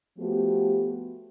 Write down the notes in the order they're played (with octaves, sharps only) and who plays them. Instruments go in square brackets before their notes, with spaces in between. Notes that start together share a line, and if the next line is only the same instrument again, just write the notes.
[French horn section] F3 A3 B3 F#4 G4